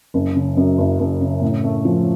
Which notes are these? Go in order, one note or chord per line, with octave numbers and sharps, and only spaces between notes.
F#1
C#3
F#2
F#1
F#1
C#3
A2
A3
F3